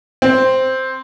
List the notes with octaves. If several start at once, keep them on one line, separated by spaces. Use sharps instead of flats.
C4